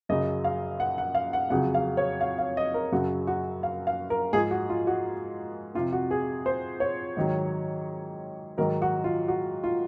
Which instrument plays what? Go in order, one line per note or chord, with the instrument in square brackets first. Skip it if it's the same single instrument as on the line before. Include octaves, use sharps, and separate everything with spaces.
[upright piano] F#2 C#3 F#3 D#5
F5
F#5
F#5
F5
F#5
F2 C#3 F#3 F#5
F5
C#5
F5
F5
D#5
A#4
F#2 C#3 F#3 F#4
F#4
F5
F5
A#4
G#2 G#4
F3
F#4
F4
F#4
F2 C3 F3 F4
F#4
G#4
C5
C#5
G#2 D#3 F#3
G#2 D#3 F#3 A#4
F#4
F4
F#4
F4